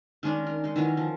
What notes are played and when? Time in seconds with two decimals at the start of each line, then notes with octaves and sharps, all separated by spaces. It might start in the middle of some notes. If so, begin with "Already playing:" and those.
0.23 D#3 G#3 C#4 D4
0.47 A#4
0.64 G#3 D#4
0.76 D#3 E3 F#3 C#4
0.97 F3